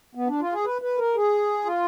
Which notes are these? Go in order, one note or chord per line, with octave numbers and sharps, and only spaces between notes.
B3
D4
F4
G#4
B4
B4
A#4
G#4
F4